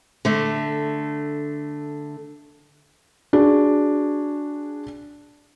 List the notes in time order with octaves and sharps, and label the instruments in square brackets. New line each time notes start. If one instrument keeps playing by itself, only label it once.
[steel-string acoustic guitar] D3 A3
[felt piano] D4 F#4 G#4